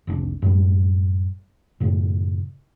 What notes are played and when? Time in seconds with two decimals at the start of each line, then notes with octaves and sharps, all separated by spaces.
0.07 F1 C2 C#4 D4
0.42 F#2 A2 G3
1.80 F#2 A2 C#3